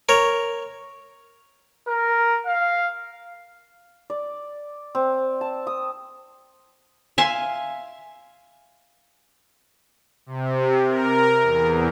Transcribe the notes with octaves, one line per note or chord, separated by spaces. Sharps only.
A#4 C#5
A#4
F5
D5
C4
A5
D#6
E5 F5 G#5 C6
C3
A#4
E2